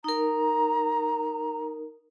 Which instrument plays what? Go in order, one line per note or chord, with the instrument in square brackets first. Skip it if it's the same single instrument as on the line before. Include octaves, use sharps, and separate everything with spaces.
[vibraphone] D#4 A#4 [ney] A#5